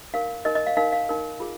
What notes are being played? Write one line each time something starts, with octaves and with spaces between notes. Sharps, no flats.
D#4 A#4 F5
D#4 A#4 D#5
D#5
F5
D#4 A#4 F5
F5
D#4 A#4
F4 G#4